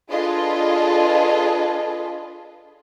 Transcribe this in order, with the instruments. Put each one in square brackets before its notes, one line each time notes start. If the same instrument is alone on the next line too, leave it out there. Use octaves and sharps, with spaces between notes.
[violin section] D4 F4 G#4 A4 B4 D#5